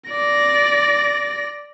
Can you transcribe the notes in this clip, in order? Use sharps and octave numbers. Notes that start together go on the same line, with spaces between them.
D5 A#6